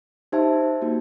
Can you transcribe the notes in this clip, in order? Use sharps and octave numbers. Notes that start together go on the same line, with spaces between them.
D#4 G4 C5 E5 A5
A#3 D#4 F#4